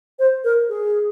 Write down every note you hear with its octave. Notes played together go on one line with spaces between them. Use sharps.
C5
A#4
G#4